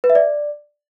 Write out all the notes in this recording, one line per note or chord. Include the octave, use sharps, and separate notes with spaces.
B4
E5
D5